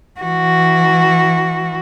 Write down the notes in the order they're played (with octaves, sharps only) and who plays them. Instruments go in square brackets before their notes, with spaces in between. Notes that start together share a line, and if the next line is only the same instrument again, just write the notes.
[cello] E3 F#4